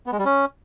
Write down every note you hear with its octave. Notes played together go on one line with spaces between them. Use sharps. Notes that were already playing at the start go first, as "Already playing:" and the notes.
B3
G#3
G3
C#4